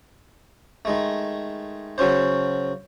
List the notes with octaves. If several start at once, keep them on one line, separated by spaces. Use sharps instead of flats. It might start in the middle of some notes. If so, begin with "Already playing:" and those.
D#3 G#3 A3
C#3 F#3 C#4 C5